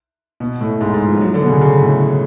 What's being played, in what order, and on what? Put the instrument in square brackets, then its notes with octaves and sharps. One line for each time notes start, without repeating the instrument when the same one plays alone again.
[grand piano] B2
A2
G#2
G#2
F3
F#3
D3
B2
C#3
C#3
A2